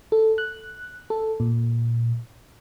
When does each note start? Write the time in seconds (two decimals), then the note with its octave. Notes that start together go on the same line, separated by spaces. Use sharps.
0.12 A4
0.38 F#6
1.10 A4
1.40 A#2